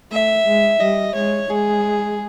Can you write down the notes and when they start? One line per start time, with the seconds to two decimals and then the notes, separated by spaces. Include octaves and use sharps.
0.11 A3 E5
0.46 G#3
0.80 G3 D#5
1.15 G#3 C#5
1.49 G#3 G#4